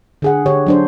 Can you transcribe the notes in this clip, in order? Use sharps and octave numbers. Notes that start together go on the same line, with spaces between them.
D3 G#4 F#5
D3 G4 C#5
F#3 D4 C5